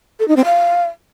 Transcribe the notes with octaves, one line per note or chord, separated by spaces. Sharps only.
A4
D#4
C4
F5